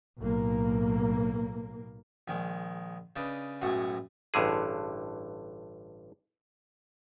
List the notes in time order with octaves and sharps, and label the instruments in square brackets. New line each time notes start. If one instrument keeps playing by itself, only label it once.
[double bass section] B1 A2 A#3
[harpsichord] A#1 D#3 G#3
C#3 D4 D#4 B4
B1 F#2 A2 G#3 F#4 C#6
[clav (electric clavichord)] A1 G2 D3 G#4